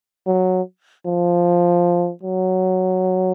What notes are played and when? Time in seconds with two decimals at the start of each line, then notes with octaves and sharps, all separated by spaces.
0.26 F#3
1.06 F3
2.23 F#3